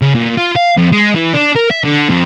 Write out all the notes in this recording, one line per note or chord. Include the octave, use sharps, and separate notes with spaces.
C#3
A#2
F4
F5
F2
G#3
E3
D4
A#4
E5
D3
F2